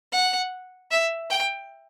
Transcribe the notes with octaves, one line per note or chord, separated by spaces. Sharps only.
F#5
E5
G5